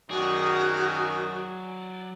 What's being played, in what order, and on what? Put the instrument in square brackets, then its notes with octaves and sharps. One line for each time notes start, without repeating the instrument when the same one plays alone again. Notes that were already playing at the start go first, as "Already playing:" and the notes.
[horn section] F#2 D#3 [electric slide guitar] F#3 D5 [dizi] F#4 [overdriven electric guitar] G#4